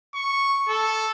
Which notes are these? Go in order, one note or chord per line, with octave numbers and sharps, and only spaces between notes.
C#6
A4